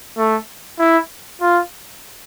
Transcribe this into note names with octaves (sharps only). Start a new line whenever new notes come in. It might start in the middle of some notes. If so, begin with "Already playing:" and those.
A3
E4
F4